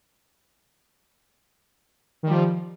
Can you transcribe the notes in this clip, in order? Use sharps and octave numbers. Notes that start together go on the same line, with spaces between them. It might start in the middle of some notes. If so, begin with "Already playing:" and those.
D#3 F3 G3